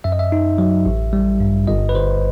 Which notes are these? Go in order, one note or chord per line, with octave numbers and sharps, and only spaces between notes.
F#2 E5
D#5
E5
D#4
F#3
A1
G3
G2
G1 D#5
B4
G1 C5